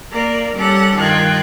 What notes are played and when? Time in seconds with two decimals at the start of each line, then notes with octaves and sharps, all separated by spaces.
0.12 A#3 A#4 D5
0.56 G3 C#4 G4 A4 F#5
0.97 G2 D#3 F4 G5 F#6 G#6